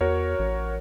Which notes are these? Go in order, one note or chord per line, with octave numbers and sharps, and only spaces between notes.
E2 F#4 A#4 C#5
A1